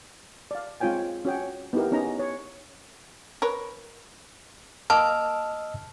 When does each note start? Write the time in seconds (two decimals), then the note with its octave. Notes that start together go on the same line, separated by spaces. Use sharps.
0.51 D5 F5
0.80 G#3 C4 F4 C#5 G5 G#5
1.25 C#4 F#4 C#5 G5
1.73 B3 D#4 E4 G4 A#4
1.91 B3 C#4 D#4 A#5
2.19 C#5
3.42 A#4 B4 C#5
4.90 A#3 D#5 A5 E6 F6